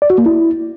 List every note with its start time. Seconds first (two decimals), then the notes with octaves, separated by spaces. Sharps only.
0.02 D5
0.10 F#4
0.18 A#3
0.26 E4